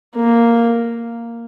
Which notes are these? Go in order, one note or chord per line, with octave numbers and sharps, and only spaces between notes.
A#3